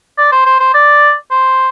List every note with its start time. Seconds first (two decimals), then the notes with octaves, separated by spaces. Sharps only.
0.18 D5
0.32 C5
0.46 C5
0.60 C5
0.74 D5
1.31 C5